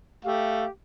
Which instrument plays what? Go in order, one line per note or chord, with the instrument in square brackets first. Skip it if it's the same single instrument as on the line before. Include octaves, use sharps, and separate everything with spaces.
[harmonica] A3 [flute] G4 [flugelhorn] F5